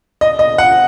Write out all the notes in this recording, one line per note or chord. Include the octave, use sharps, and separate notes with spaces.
D#5
D#5
F#5